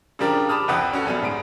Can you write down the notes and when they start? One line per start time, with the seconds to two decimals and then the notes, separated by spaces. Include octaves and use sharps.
0.19 C#3 F3 G3 D4 G4 A#4
0.49 A5 B5 D6 D#6 F6
0.68 C2 F2 B4 F#5 G5 D#6
0.93 C#4 F#4 A4
1.05 D#1 F#2 G3 B3 B5
1.22 G#2 D7